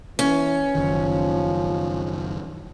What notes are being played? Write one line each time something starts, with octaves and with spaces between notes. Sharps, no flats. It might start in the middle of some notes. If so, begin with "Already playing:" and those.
E3 C#4
F#1 D#3 F3